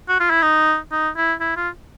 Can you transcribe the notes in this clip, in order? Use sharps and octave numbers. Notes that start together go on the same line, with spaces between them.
F#4
F4
E4
D#4
D#4
E4
E4
F4